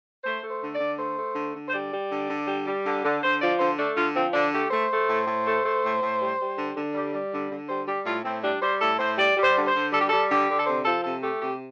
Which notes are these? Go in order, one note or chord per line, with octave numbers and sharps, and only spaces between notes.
A3 C5
A3
C5
D3
D5
D3
A3 C5
A3
D3
D3
C5
G3 D5
G3
D3
D3
G3
G3
D3
D3
D3 C5
F3 D5
D3 C5
A3 D4
D3 F4
F3 C4
D3 D4
A3 G4
A3 C5
A3
A2
A2
A3
A3
A2
A2
G3
G3
D3
D3
G3
G3
D3
D3
G3 C5
G3 G4
A2 F4
A2 C4
G3 D4
G3 C5
A2 A4
A2 C5
G3 D5
G3
C5
D3
C5
D3
G3 A4
G4
G3 A4
D3 G4
D3
A4
C3 C5
F3 A4
C3 A4
A3 G4
C3 G4